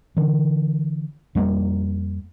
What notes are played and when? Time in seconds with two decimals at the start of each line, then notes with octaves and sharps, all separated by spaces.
0.17 D3 E3
1.35 F2 G3 G#3 A#3